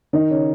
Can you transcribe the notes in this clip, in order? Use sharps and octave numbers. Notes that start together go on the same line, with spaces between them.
D#3 D#4
C#3 C#4